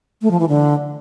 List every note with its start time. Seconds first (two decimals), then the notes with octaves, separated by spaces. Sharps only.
0.22 A3
0.31 F3
0.40 E3
0.49 D3